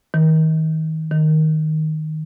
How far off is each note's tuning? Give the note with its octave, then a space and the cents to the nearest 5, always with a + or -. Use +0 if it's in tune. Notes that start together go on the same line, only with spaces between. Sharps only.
D#3 +30
D#3 +0